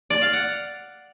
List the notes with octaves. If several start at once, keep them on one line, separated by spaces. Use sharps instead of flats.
D5
F5
F#5